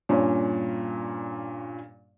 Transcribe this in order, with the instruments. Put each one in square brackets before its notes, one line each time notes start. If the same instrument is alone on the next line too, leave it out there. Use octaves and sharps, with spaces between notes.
[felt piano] G2 A#2 C#4